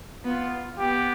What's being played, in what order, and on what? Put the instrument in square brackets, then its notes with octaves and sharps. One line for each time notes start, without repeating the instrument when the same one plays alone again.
[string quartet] B3 [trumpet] F4
[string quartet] B3 [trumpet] G4